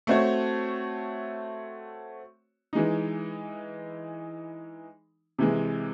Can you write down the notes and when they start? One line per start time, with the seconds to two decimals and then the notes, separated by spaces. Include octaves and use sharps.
0.07 A3 C4 F#4 C#5
2.73 E3 G#3 D#4
5.39 C3 E3 G#3